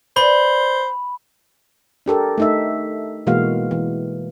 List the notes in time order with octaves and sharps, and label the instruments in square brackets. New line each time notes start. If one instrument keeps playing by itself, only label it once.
[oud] B4 D5 [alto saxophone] C5 [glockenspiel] B5
[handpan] D4 G4 A4 A#4
A3 D#4 E5
B2 E3 G#3 A#3 F#4 F5
E3